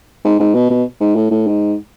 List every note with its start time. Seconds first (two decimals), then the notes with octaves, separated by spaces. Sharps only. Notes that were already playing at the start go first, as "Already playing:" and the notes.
0.25 G#2
0.40 G#2
0.54 B2
0.70 B2
1.00 G#2
1.16 A2
1.31 A2
1.47 G#2